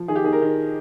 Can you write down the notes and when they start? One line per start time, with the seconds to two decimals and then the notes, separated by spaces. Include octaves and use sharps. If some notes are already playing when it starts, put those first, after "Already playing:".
Already playing: F3
0.08 D#3 G#4
0.15 G4
0.24 D#3 G#4
0.33 A#4
0.41 D#3